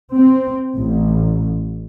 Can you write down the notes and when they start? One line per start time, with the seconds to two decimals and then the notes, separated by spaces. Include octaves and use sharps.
0.14 C4
0.76 A1